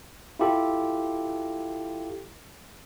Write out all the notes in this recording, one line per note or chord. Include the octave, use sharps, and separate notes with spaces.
E4 F4 G4 A4